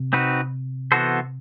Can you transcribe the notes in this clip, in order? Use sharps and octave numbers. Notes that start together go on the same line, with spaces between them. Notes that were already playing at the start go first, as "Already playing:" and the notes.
Already playing: C3
C4 D#4 F#4 B4
E3 B3 F#4 A4 C5